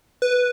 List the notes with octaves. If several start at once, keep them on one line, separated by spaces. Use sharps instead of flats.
B4